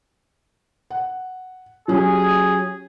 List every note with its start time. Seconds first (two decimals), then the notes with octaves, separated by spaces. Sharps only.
0.91 F#5
1.88 F#3 C#4 G4 G#4